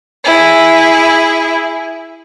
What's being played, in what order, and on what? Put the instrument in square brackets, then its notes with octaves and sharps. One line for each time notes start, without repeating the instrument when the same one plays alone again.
[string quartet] E4 G#4